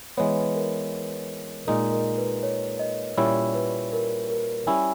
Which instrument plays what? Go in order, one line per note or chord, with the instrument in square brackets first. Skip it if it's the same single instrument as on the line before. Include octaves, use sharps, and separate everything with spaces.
[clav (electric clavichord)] E3 G#3 B3 [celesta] C#5
[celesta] A#4
[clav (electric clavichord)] A#2 G#3 D#4 [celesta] A#4
[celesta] A#4
B4
C#5
D#5
[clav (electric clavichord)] A#2 G3 C#4 E4 [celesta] C#5
[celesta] B4
A#4
A#4
[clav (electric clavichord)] G3 C#4 E4 [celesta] G#5